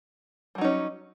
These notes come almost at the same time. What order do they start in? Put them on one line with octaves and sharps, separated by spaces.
G3 F#3 D#4 C#4